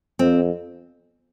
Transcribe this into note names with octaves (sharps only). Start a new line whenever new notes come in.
F2 C4